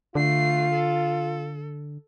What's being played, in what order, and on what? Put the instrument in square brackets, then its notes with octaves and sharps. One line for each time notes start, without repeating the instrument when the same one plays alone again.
[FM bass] D3 [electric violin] A3 C7 [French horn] F4
[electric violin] A4